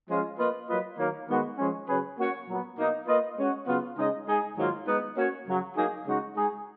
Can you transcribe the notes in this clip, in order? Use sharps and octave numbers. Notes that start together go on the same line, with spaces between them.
F3 G#3 C#4 F4
A#3 F4 B4 D#5
F#3 A#3 F4 B4 D#5
D#3 F#3 A#3
D#3 G#3 B3 F#4 B4
F3 G#3 C#4
C#3 F#3 C#4 G#4 B4
A#3 C#4 F#4 C#5
A#2 F#3 B3
B2 A#3 D#4
A#3 F4 B4 D#5
G#3 C#4 F#4
C#3 F#3 B3 F4
C#3 G#3 D#4 G#4 D#5
G#3 D#4 G#4
G#2 D#3 F#3 A#3 F4
G#3 B3 D#4
A#3 C#4 F#4 C#5
F#2 C#3 F#3
F#3 A#3 D#4 G#4
C#3 G#3 D#4 F#4
G#3 D#4 G#4